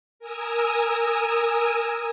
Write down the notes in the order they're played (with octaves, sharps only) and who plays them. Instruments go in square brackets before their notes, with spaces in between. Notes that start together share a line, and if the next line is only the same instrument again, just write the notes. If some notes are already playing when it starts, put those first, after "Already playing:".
[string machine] A#4 G#5 D#6 E6